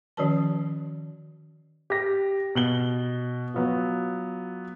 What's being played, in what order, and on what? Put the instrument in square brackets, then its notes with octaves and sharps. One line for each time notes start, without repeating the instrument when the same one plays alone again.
[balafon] D#3 F3 C#4 F#4 B4 A5
[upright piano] G4 A#6
B2 F#7 G7
F#3 B3 F4